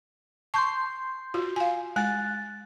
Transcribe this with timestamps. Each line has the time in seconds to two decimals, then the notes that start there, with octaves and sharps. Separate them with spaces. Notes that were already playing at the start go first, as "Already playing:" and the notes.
0.54 A5 C6 C#6 G6 C7
1.34 F4 F#4
1.56 F5 G#5
1.96 G#3 G#5 F#6 A6